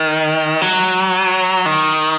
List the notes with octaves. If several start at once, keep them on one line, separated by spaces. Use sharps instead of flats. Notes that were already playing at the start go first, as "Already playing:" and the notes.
Already playing: D#3
F#3
D#3